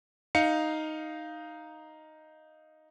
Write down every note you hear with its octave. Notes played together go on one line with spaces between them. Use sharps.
D#4 F5 C#7